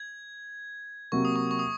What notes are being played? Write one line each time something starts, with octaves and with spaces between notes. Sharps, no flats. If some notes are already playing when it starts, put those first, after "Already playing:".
Already playing: G#6
C3 F#3 A#3 C#6
D#6
C#6
C#6
D#6